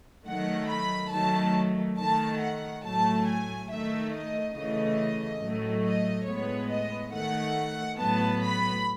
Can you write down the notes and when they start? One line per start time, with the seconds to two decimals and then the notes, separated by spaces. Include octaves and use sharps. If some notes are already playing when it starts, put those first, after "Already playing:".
0.26 D#3 F#3 A3 F#5
0.69 B5
1.12 D#3 F#3 A3 A5
1.98 D#3 A3 A5
2.41 F#5
2.84 A2 F#3 A3 A5
3.27 G#5
3.69 D#3 A3 E5
4.12 D#5
4.55 C#3 E3 A3 D#5
5.41 A2 F#3 A3
5.84 D#5
6.26 A2 G#3 B3 C#5
6.70 D#5
7.12 D#3 A3 F#5
7.98 A2 F#3 B3 A5
8.41 B5